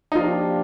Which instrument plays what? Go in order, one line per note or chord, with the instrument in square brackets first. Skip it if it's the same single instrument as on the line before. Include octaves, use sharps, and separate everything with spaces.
[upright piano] D#4
[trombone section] F3 A#3 D4 G4 [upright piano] F4